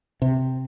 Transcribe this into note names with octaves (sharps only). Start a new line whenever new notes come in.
C3